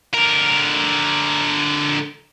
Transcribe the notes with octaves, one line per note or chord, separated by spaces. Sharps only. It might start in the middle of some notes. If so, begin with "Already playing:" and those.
D3 A#4